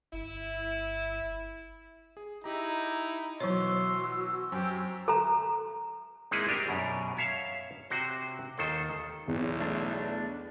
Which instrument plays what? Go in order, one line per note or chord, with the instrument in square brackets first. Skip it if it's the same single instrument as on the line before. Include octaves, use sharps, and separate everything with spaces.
[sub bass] G1 [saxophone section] E4
[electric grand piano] G#4
[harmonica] D#4 E4 [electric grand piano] G4 A#5
[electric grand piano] B2 E3 [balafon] F#3 C#5 [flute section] F#4 E6 [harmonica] C6
[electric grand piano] F#2 G#5 [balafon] F#3 [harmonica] C4 G4
[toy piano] A4 A#5
[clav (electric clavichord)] G#3 A#3 C4 D#4 E4 G#4
G3 D4 G4 A#4
F#2 B2
C#5 E5 F5
C3 F#4 C5
D#2 D#3 A4 C5
[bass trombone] B1 [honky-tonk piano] E2
[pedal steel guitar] A3 D4